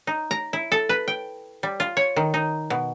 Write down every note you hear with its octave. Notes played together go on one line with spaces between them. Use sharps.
D#4
A#5
E4
A4
B4
G5
G3
F4
C#5
D#3
D#4
B2